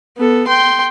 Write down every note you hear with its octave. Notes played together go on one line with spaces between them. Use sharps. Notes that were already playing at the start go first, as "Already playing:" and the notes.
B3 A4
G5 C6